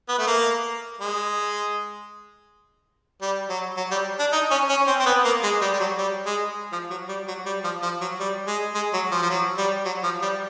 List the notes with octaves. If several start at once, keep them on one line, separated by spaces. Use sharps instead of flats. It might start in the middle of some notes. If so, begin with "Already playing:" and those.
B3
A3
A#3
G#3
G3
F#3
F#3
G3
D4
D#4
C#4
C#4
C4
C4
B3
A#3
G#3
G3
G3
F#3
G3
G#3
F3
F#3
G3
F#3
G3
F3
F3
F#3
G3
G#3
G#3
F#3
F3
F3
F#3
G3
F#3
F3
G3